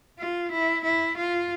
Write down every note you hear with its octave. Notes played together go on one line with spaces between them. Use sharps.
F4
E4
E4
F4